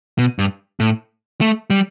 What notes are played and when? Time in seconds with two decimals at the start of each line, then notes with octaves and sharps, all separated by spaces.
0.19 B2
0.39 G2
0.80 A2
1.41 A3
1.70 G3